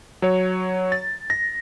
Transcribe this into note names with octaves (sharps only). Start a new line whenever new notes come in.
F#3 C#5
A6
A#6